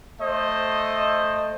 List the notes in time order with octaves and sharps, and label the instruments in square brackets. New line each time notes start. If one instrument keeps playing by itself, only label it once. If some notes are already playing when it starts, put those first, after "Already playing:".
[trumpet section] A3 C5 D#5